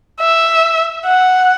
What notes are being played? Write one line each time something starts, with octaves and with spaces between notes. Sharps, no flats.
E5
F#5